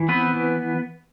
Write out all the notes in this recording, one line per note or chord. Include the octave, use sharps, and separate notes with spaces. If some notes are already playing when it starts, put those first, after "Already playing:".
Already playing: E3
B3 C4 B4
E3